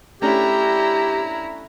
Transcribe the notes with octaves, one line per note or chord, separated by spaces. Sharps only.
A3 C#4 D4 E4 G4 A#5